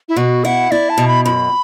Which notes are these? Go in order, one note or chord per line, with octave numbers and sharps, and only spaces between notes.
E4
B2 F#4
E4 F#5
E4 D5
A5
B2
B5
F#2 B5